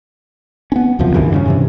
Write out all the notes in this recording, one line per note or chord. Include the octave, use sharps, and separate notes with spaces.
B3 C#4
C#2 F#2 C3 F3
D2 G2 D#3 E3
G2 C#3 C#4
G2 C3 E3